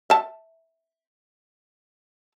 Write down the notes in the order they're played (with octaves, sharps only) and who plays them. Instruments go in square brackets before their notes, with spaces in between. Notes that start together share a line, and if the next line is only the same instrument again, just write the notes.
[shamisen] E5 A5